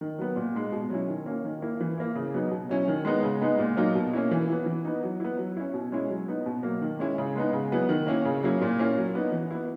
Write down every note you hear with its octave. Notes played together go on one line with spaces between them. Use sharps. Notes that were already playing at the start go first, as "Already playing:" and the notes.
D#3
F#3 B3
A#2
G#3 D#4
B2
F#3 C#4 E4
D#3
A#3 C#4
D#3
A#3 E4
E3
A#3 E4
C#3
F#3 B3 D#4
B2
F#3 C#4 E4
D#3
G#3 B3 D#4
C#3
G#3 B3 D#4
A#2
F#3 A#3 D#4
B2
A#3 C#4 E4
E3
B3 E4
E3
B3 D#4
F#3
B3 E4
F#3
C#4 E4
B2
G#3 C#4 E4
F#3
B3 D#4
B2
F#3 A#3
D#3
G#3 C#4 E4
C#3
G#3 B3 D#4
C#3
F#3 B3 E4
D#3
A#3 C#4 E4
C#3
F#3 A#3 C#4 E4
A#2
A#3 C#4 E4
F#3
B3 D#4
E3
B3 E4